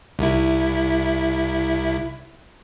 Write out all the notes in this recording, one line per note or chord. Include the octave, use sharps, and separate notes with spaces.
C2 E4